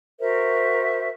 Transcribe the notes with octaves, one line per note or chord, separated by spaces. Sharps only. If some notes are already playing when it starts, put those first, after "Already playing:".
F#4 A#4 C5 E5